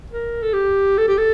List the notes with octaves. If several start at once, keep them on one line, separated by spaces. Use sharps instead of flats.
A#4
A4
G4
A4
G4
A4